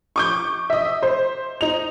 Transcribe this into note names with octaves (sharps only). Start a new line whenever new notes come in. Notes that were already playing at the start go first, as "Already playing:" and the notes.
C#6 D6 G6
D#5 E5
C5
D#4 F7